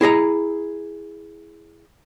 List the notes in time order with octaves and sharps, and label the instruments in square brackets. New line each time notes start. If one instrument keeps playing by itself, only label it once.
[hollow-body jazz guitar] E4 G#4 D#5 A#5